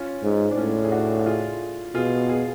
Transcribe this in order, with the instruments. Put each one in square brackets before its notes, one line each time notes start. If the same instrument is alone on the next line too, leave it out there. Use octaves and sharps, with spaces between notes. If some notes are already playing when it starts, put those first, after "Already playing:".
Already playing: [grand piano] C#4 F4
[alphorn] G#2
[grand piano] D4
[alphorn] A2 [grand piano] C#4
[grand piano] G#4
D4 F#4
F#4
F4 G#4
[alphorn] B2 [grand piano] F4 G#4
[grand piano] F4 G#4